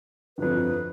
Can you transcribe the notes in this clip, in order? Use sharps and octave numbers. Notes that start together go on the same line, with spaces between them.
G1 F2 B4